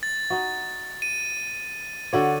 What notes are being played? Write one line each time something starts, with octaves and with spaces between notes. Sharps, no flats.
A6
D#4 F#4
D#7
D3 F#4 C#5